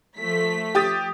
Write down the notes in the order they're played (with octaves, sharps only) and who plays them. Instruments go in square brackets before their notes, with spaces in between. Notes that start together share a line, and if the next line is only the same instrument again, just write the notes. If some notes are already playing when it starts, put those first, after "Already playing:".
[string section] F3 A3 B6
[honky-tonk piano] G4 D#6 A6